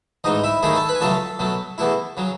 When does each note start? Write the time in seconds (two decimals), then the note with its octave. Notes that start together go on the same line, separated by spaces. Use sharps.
0.24 A1 G#2 E3 D#4 D#5
0.44 E4 E5
0.63 D#2 D#3 A3 E4 G#4 G#5
0.75 A4 A5
0.89 B4 B5
0.95 G#5
1.01 C#2 C#3 F#3 A3 A4 A5
1.39 B2 F#3 A3
1.78 E2 B2 A3 E4
2.17 C#3 F#3